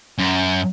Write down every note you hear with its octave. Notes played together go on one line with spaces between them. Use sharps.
F#2